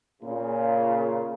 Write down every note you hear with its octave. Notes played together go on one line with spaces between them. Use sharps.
A#2 C#3